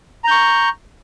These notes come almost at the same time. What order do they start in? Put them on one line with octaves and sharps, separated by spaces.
A#5 G6 C#6